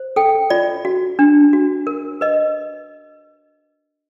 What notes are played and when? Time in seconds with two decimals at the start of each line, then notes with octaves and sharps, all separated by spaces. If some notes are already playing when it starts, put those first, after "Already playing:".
Already playing: C5
0.16 A4 G5
0.50 F4 D5
0.85 F#4
1.19 D4
1.53 F#4
1.87 A#4
2.21 B4 D#5